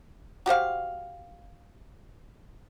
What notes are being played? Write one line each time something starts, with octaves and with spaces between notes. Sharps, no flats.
F#4 G4 C5 F5